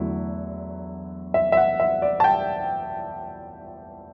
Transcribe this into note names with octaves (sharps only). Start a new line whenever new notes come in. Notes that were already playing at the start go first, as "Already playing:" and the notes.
Already playing: E2 D3 F#3 A3 E4
E5
E5
F#5
E5
D5
A5
G5